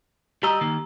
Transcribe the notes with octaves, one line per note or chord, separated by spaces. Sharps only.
G3 G4 D#5 A#5 E6
D#3 A#3